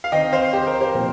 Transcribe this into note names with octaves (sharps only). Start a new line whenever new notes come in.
F5
D#3 C4 D#5 G5
C5 F5
G4 C5
A#4
G4 C5
A#2 F3 C4